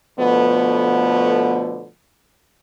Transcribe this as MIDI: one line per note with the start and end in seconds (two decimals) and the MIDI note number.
0.19 1.87 47
0.19 1.87 50
0.19 1.87 53
0.19 1.87 57
0.19 1.87 59